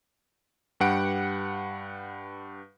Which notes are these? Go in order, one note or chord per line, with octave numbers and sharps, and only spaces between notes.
G2 G4 B4 F#5 C#7 D7